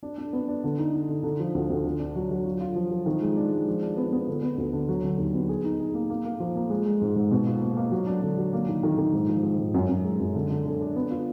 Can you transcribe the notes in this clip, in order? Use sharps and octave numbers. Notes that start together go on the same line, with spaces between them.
D4
D4
B3
D4
D3
D#4
D#4
D3
D3
F3
D2
D2
D3
D4
F#3
F#3
F4
F4
F3
F3
D#3
G#3
D4
G#3
F3
D4
B3
B3
D3
B3
D2
D3
F#3
D3
D#2
B3
G#4
D#4
G#4
A#3
A#3
A#3
F3
A#3
G#3
G#3
G#2
G#2
B2
F4
A#3
A#3
F#3
D4
D3
F#3
A#3
D#3
D#3
D#3
G#2
F3
G#2
G#2
F#2
F#2
G#3
F#2
D3
D3
D3
D4
B3
F4